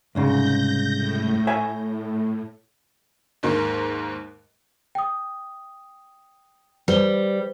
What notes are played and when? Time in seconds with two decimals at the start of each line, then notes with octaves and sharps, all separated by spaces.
0.15 C2 G#2 C#3 G6 A#6
0.94 A2
1.47 C#5 E5 G#5
1.77 A2
3.43 D#2 G#2 A#3
4.95 G5 D#6
6.88 G3 B4 C5 G7